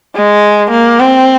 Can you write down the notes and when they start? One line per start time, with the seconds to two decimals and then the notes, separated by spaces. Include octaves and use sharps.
0.15 G#3
0.71 A#3
0.99 C4